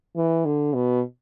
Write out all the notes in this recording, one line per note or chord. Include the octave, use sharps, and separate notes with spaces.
E3
D3
B2